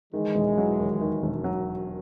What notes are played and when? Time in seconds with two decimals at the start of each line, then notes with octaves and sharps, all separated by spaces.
0.13 D#3 E3 G#3
0.35 E1
0.58 F#3
0.80 D#2
1.01 D#3
1.23 E1
1.44 F#3